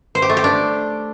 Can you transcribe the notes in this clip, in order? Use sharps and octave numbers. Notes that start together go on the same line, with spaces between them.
C5
G4
A3
G4
D4